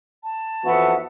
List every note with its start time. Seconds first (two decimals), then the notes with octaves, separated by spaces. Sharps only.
0.23 A5
0.65 F2 E3 B3 F#4 E5 F#5